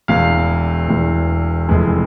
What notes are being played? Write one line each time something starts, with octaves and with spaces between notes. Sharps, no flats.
E1 E2 E3 F5
E1 E2 E3
F1 F2 E3 G#3